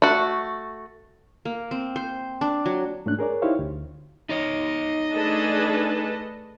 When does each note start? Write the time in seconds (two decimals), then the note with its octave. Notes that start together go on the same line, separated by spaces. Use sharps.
0.02 A3 F#4
1.45 A#3
1.71 C4
1.96 C5
2.41 D4
2.66 F#3
3.06 G#2 A3 C#4 D4 F#6
3.19 G#4 A#4 C#5 D5
3.42 D#4 E4 G4 C5 C#5 F5
3.59 D2
4.29 D#4 C#5 D#5
5.12 A3 D4 G#4 A4 B4